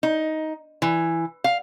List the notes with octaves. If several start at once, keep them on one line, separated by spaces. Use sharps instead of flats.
D#4
E3
F5